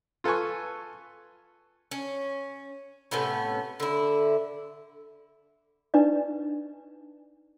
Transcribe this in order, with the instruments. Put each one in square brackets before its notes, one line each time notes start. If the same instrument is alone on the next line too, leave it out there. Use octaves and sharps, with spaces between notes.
[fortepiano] F4 A4 B4 G#5 C#6
[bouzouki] C#4
A2 C3 B3 C#4
D3 E4
[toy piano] D4 D#4 B4 D5